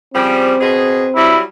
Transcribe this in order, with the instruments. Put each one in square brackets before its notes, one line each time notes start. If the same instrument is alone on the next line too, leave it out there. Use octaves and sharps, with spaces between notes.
[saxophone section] C#3 F3 G3 [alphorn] C4
[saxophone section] B2 G#4
[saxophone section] F#3 G3 [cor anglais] E4